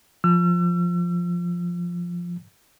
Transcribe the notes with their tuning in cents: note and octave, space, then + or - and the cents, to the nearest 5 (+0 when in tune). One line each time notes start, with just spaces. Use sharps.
F3 +0 E6 +40